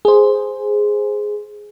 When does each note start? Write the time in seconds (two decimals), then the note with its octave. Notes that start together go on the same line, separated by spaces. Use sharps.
0.05 G#4 C5